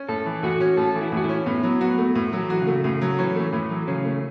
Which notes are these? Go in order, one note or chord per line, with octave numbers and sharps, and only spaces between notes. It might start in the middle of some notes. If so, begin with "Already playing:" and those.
Already playing: C#4
A2 A4
E3
A2 F#4
C#4
A2 A4
E3
E4
A2
F#4
E4
C#4
A2 B3
F#3
B3 F#4
A3
A2
F#3
E3
F#4
C#3
A3
A2 C#3
F#3
E3 C#4
A3
A2 E3
F#3
C#3 C#4
A3